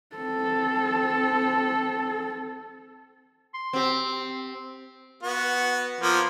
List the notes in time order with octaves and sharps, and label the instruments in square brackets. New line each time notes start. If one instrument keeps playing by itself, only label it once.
[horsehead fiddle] C4 A4
[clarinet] C6
[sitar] C4 G4
[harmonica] B3 F#4
F3 A#3 B3